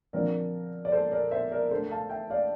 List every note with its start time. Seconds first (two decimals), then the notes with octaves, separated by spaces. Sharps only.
0.13 D3 F3 C4 A#4 D5
0.85 D5
0.92 A4 C5
1.12 A#4 D5
1.31 C5 E5
1.52 A#4 D5
1.71 D3 A3 D4 A4 C5
1.91 F5 A5
2.10 E5 G5
2.30 D5 F5